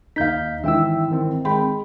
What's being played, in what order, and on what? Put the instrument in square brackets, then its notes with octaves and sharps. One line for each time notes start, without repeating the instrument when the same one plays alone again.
[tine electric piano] D#2 G6 B6 [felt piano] D#4 F5
[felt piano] G#1 E3 [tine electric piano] E5 G5 E6
[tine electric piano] D#3 C4
[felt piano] G#3 G5 B5